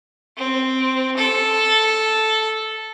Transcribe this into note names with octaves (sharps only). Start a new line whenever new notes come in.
C4
A4